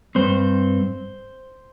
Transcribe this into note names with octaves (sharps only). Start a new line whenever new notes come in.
G2 G3 C4 C5